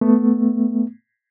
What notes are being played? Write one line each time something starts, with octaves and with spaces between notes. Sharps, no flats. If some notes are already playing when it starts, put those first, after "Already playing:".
A3 B3